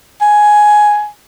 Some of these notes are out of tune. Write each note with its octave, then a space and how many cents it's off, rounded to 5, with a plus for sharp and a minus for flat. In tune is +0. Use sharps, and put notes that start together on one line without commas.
G#5 +10